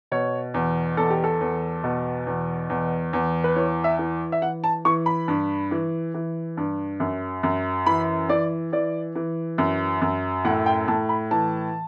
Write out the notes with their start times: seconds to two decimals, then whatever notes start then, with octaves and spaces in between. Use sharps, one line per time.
0.12 B2 C#5
0.54 E2
0.97 E2 A4
1.10 G4
1.24 A4
1.41 E2
1.84 B2
2.27 E2
2.70 E2
3.13 E2
3.44 B4
3.56 E3 C#5
3.84 E5
3.99 E3
4.32 E5
4.42 E3 F#5
4.64 A5
4.85 E3 C#6
5.06 B5
5.28 G2
5.71 E3
6.14 E3
6.57 G2
7.00 F#2
7.43 F#2
7.86 E3 B5
8.29 E3 D5
8.72 E3 D5
9.15 E3
9.58 F#2
10.02 F#2
10.45 A2 F#5
10.66 G5
10.88 A2 A5
11.09 B5
11.31 E3 A5